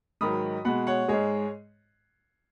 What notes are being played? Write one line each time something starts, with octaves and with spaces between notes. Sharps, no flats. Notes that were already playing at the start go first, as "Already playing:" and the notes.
G#2 D#3 F#3 B5 D#6
B2 G#3 F#5 B5
C#5 F#5
G#2 G#3 G#4 C#5